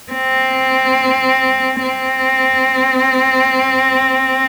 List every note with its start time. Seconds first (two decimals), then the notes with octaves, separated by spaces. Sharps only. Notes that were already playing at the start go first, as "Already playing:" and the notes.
0.12 C4
1.83 C4